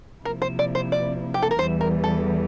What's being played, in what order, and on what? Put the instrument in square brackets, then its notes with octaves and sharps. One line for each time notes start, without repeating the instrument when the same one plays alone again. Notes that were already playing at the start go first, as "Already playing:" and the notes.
[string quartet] C3 F3 A#3 E4 [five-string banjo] A#4
[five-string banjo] C5
D5
C5
D5
G4
A4
A#4
[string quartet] E2 E3 G3 [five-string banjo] C5
[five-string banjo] A#4
A4